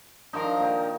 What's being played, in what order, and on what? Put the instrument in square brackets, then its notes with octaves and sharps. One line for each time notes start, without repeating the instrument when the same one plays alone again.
[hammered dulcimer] D#3 F3 D#4 [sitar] D4 A#4
[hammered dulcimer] A#2 D#4 G5